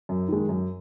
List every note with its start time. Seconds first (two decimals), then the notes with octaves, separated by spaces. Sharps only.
0.09 F#2
0.28 D#3 G#3
0.49 F#2